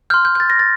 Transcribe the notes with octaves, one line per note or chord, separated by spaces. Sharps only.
C6 F6 G6
G6
G6
A6
A#6
A6